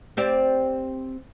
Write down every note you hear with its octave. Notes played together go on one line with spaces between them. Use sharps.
C4 G4 D5